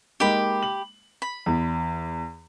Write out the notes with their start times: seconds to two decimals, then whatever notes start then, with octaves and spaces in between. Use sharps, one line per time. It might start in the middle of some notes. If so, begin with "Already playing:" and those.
0.20 G#3 A#3 D#4 G4 B5
0.63 F#7
1.22 B5
1.46 E2